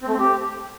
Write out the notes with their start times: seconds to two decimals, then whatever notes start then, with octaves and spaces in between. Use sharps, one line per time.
0.02 C4
0.08 A3
0.13 C4
0.19 G4